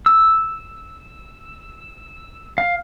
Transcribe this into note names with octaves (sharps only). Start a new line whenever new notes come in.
E6
F5